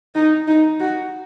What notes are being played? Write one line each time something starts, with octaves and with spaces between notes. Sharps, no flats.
D#4
D#4
F#4